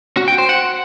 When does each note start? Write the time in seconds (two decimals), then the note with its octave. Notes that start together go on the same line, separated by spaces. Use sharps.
0.17 F#4
0.28 G5
0.38 C5
0.49 F#5